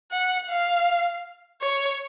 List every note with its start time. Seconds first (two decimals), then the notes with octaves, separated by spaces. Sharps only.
0.12 F#5
0.50 F5
1.61 C#5